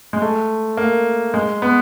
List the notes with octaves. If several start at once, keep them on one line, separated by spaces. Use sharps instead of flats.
G#3
A3
A#3
G#3
B3